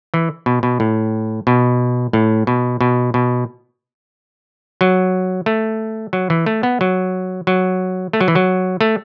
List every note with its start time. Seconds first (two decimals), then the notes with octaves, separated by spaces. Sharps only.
0.14 E3
0.46 B2
0.63 B2
0.80 A2
1.47 B2
2.13 A2
2.47 B2
2.81 B2
3.14 B2
4.81 F#3
5.46 A3
6.13 F#3
6.30 E3
6.46 A3
6.63 B3
6.81 F#3
7.47 F#3
8.13 A3
8.21 F#3
8.28 E3
8.35 F#3
8.81 A3